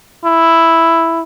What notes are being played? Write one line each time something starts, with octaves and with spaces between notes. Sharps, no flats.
E4